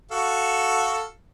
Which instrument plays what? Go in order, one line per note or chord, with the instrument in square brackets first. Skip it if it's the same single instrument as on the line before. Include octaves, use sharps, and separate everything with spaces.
[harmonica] F#4 A4 F5